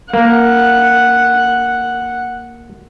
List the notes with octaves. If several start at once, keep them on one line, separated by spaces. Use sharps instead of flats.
A#3 F#5